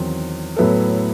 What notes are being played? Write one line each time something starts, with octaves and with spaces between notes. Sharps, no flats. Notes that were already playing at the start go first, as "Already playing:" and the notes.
Already playing: E2 D#3 F#3 C4 D#4
A2 F#3 B3 E4 A4